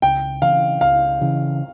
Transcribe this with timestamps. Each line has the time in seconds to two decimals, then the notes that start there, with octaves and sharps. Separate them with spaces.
0.02 C#2 G5
0.42 C#3 E3 F5
0.81 C#2 F5
1.21 C#3 E3